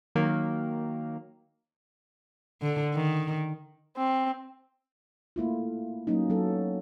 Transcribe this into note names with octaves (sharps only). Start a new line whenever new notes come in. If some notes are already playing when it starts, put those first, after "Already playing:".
D#3 F#3 A#3
D3
D#3
C4
A3 A#3 E4 F4
F#3 A#3 C#4 D#4
F#3 B3 A4